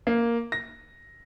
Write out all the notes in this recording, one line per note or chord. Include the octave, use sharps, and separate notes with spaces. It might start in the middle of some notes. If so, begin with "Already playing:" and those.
A#3
A#6